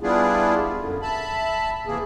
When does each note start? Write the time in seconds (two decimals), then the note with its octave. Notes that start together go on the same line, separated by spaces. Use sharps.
0.01 G3 B3 D4 E4 F4 G#4
0.79 F#2 D3
1.02 E5 A5 B5
1.86 C3 E3 A#3 G#4